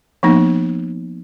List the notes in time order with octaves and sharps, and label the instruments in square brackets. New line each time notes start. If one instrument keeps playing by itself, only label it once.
[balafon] F3 A#3 B3 D#4